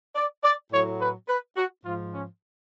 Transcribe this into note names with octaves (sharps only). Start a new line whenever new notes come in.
D5
D5
A2 F#3 C#5
B4
B4
F#4
G#2 F3 F4
C#4